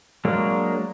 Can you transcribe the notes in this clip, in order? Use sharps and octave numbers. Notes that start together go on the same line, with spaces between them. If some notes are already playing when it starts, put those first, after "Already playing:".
F#3 G#3 A#3 D4